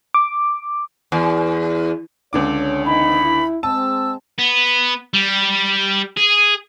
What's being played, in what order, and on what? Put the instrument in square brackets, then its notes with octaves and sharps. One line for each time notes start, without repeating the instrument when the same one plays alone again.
[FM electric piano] D6
[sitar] E2
[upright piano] C#2 D3 D6 [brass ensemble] C#5
[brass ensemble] E3 C4 D#4 [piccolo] B5
[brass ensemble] E4
[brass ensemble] G#3 C4 [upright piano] A5 [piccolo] E6
[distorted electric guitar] B3
G3
G#4